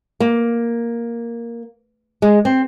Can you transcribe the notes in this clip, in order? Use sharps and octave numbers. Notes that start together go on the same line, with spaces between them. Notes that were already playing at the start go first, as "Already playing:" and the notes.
A#3
G#3
C4